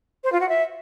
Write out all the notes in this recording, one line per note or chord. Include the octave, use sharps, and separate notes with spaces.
C5
F4
F#4
E5